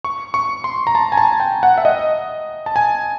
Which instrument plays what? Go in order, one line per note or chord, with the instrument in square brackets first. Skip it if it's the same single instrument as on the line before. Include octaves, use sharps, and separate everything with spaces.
[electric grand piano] C#6
C#6
C6
A#5
A5
G#5
A5
G5
F#5
E5
D#5
A5
G#5